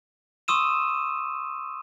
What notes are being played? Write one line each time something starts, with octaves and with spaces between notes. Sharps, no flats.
C6 C#6 D#6 E6 D#7 E7